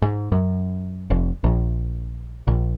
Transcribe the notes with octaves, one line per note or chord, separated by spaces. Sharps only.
G#2
F#2
F1
A#1
A#1